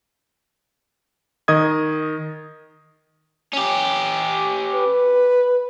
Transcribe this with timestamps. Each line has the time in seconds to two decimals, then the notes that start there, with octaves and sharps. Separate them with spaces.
1.48 D#3 D#5 D#6 G#6
3.53 C#4 G4
4.75 B4